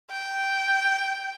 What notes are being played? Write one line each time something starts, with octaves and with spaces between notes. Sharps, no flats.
G5